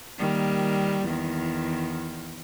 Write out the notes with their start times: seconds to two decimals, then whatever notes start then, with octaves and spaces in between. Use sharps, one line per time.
0.19 D#3 G3 A#3
1.05 E2 D#3